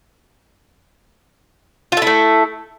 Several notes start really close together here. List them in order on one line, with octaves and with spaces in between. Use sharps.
F4 A4 E4 A3